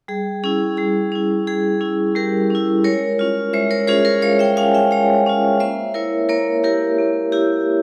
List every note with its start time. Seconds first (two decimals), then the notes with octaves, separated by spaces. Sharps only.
0.08 G3 G#4
0.44 C#4 E4 G#4
0.77 G3 G#4
1.12 C#4 E4
1.47 G3 G#4
1.81 C#4 E4
2.15 G3 G4 A#4
2.50 C#4 E4
2.84 G#3 A#4 C#5
3.19 C#4 F4
3.53 G#3 C5 E5
3.71 A#4 C#5
3.87 C#4 F4 G#4 C5
4.05 A#4 C#5
4.22 G#3 C#5 F5
4.39 E5 G5
4.56 C#4 F4 F5 G#5
4.74 E5 G5
4.91 G#3 C#5 F5
5.26 C#4 F4
5.60 A#3 C5 E5
5.94 E4 A#4 C#5
6.29 A#3 A#4 C#5
6.64 E4 G4 A#4
6.98 A#3
7.32 E4 G4